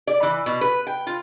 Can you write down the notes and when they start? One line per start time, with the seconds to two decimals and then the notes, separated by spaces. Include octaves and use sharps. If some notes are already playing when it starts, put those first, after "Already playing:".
0.07 D5
0.23 E3
0.46 B2
0.61 B4
0.87 G5
1.07 F4